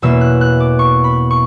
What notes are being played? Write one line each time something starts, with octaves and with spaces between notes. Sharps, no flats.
E2 B2 A#3 C#4 E4 E6
F#6
F#6
D6
C#6
B5
C#6